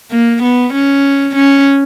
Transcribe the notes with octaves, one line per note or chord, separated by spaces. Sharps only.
A#3
B3
C#4
C#4